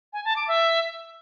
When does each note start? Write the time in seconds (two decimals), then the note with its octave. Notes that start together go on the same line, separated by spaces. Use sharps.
0.13 G#5
0.25 A5
0.36 D6
0.48 E5